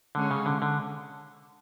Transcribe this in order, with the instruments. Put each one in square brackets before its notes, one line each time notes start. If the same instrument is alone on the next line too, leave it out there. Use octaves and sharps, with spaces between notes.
[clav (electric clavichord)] D3 [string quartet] G#3 C#4 G#4 C#5
[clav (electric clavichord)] C#3
D3
D3